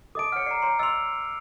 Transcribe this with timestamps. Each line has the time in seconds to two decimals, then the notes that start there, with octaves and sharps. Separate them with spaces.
0.15 A4 D#5 A5 D6 D7
0.32 C#5 F#5 F6 C#7
0.46 D5 A#5 C7
0.62 C#5 A#5 C6
0.79 D#5 C6 E6 F7